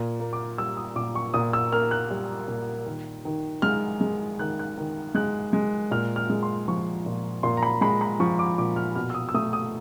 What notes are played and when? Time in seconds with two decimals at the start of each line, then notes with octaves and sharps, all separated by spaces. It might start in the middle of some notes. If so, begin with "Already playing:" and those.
Already playing: A#2
0.20 A#3
0.33 D6
0.58 G3 E6
0.77 D#6
0.96 A#2 D6
1.15 C#6
1.34 A#2 D#6
1.53 E6
1.72 A#3 F6
1.91 F#6
2.11 G3
2.48 A#2
2.86 D#3
3.25 D#3
3.62 G#3 F6
4.01 G#3
4.39 D#3 F#6
4.59 F#6
4.78 D#3
5.15 G#3 F#6
5.53 G#3
5.91 A#2 F6
6.16 F6
6.30 G#3
6.43 C6
6.68 F3 C#6
7.06 A#2
7.43 A#2 C6
7.57 A#5
7.63 B5
7.81 G#3 B5
8.01 B5
8.20 F3 C#6
8.39 D6
8.58 A#2 D6
8.76 F6
8.96 B2 F6
9.10 E6
9.14 D#6
9.29 E6
9.34 A3 D#6
9.53 D#6